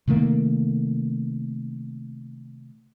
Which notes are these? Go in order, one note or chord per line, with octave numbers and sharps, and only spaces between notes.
C3 D#3 A3 A#3